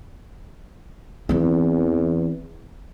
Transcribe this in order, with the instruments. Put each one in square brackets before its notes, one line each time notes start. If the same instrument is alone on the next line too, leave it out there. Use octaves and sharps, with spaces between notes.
[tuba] E2 [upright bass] E3 C4